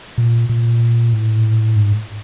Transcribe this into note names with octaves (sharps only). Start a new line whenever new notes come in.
A#2
A#2
A2
G#2